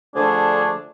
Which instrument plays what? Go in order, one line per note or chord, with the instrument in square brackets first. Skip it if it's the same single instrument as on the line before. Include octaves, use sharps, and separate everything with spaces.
[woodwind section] D3 F3 A3 D4 G#4